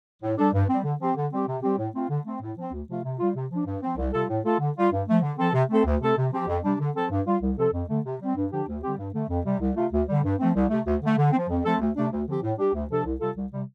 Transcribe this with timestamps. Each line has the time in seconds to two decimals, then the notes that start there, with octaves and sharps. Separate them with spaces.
0.22 A2
0.38 G3 D4 A4
0.54 G2
0.69 G3 C4
0.84 D3
1.00 F3 C4 G4
1.16 D3
1.32 G3 C4 G4
1.47 C3
1.63 G3 C4 G4
1.78 A2
1.94 A3 C4 F4
2.10 D3
2.25 A3 C4
2.41 A2
2.57 F3 C4
2.72 D2
2.89 C3 F3 A3 F4
3.04 C3
3.19 G3 F4
3.35 C3
3.51 F3 D4
3.66 G2
3.82 F3 C4
3.97 C2
4.13 C3 G3 F4 A4
4.30 A2
4.44 A3 F4 A4
4.60 D3
4.77 G3 F4
4.92 G2
5.07 F3 A3
5.22 D3
5.38 F3 C4 A4
5.54 C3
5.70 A3 C4 A4
5.85 D2
6.01 C3 A3 C4 A4
6.17 C3
6.32 F3 C4 G4
6.47 F2
6.64 C3 G3 D4
6.80 D3
6.95 F3 C4 A4
7.11 G2
7.26 G3 F4
7.42 C2
7.57 C3 F3 C4 A4
7.73 F2
7.89 D3 A3
8.05 C3
8.21 G3 C4
8.35 G2
8.51 D3 F3 D4 G4
8.68 D2
8.83 D3 G3 C4 G4
8.98 G2
9.14 D3 A3
9.29 F2
9.45 C3 G3
9.60 C2
9.76 C3 A3 F4
9.92 D2
10.09 D3 G3
10.24 G2
10.39 F3 A3 C4
10.55 C2
10.70 C3 A3
10.86 D2
11.02 D3 A3
11.18 D3
11.33 C4
11.38 F3
11.49 F2
11.65 F3 A3 C4 A4
11.81 D2
11.96 C3 A3 D4
12.12 D2
12.26 D3 F3 C4 G4
12.43 A2
12.58 G3 D4 G4
12.74 D2
12.90 C3 F3 D4 A4
13.05 C2
13.20 C3 G3 F4 A4
13.36 C2
13.53 C3 G3